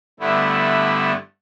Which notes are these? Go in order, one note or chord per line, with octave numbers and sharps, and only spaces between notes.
G2 D3 A3 B3 E4